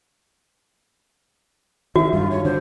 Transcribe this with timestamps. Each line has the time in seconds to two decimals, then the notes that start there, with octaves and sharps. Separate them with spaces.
1.96 D#3 F#4 E5
2.13 G2 F4
2.31 C#5
2.45 D3 C5